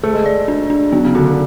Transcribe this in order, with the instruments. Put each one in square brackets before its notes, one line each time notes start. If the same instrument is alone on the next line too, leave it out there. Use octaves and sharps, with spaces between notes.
[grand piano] A3 [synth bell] G#4
[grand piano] G#3
[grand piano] A3 [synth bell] D5
[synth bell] D4
D4
[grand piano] F#3 [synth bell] B3
[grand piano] C#3
[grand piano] D3 [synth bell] F#4
[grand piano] D3